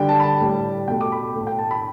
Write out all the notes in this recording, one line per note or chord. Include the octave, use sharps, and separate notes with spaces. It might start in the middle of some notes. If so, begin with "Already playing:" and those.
Already playing: D3 G3 G5
A5
B5
A5
A2 G3
B2 A3 G5
D6
B5
A3
A2
G5
A5
B5